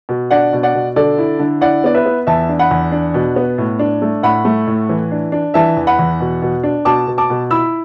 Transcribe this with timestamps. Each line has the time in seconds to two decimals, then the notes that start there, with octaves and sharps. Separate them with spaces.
0.09 B2
0.31 D4 D5 F#5
0.53 B2
0.63 D5 F#5
0.74 B2
0.96 D3 A4 D5
1.18 E4
1.39 D3
1.61 E4 D5 F#5
1.84 B3 D5
1.94 B4 E5
2.06 B3
2.27 E2 E5 A5
2.49 D4
2.59 F#5 B5
2.71 E2
2.92 D4
3.14 B2
3.36 B3
3.58 A2
3.79 D4
4.02 A3
4.23 A2 F#5 B5
4.45 A3
4.67 A2
4.89 E3
5.12 D4
5.32 D4
5.54 E3 E5 A5
5.77 E2
5.87 F#5 B5
5.99 E2
6.21 B2
6.42 B2
6.63 D4
6.85 B2 A5 D6
7.07 B2
7.18 A5 D6
7.30 B2
7.51 E4 B5 E6